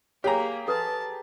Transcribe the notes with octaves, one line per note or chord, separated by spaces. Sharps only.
A#3 G4 G#4 C#5 A#5
A4 B4 A5 C6